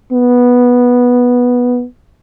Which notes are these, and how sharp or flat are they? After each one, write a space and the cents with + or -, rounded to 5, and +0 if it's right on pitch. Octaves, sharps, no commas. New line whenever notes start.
B3 -10